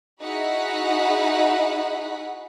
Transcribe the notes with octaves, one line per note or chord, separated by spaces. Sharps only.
D#4 E4 F#4 G#4 F#5 B5